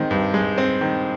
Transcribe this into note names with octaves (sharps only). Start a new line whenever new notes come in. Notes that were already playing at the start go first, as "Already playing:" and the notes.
Already playing: D#3 G#3 C4
G2
G#3
C4
D#3